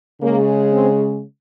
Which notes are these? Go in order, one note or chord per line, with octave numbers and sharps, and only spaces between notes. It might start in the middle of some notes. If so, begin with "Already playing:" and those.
C#3 G#3 A#3
C4